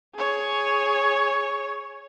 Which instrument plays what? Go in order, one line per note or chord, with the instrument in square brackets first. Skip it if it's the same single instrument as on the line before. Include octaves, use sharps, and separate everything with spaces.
[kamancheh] G#4 C#5